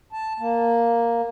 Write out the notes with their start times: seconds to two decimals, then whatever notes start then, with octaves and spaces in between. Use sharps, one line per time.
0.12 A5
0.40 A#3